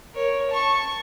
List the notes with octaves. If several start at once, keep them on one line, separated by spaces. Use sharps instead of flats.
A#4 C#5
A5 C#6